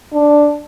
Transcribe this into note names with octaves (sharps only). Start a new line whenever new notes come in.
D4